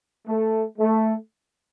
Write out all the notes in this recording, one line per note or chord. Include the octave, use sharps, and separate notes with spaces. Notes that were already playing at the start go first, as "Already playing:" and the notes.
A3
A3